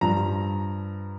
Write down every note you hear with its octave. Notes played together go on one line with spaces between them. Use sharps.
G2 F3 A#5